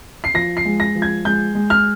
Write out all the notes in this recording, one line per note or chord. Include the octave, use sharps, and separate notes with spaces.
C7
F3 A#6
C7
G#3
A#6
F3
G#6
G#3 G6
G#3
F6